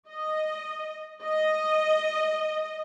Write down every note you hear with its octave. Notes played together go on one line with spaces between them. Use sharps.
D#5
D#5